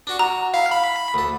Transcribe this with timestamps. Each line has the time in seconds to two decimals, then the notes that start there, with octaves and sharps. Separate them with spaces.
0.07 D4 F#4 C#6
0.19 F#4 A#5
0.54 E4 F5
0.71 B5
1.14 D2 A4